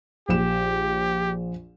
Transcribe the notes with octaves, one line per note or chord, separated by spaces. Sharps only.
A#1 G4 E7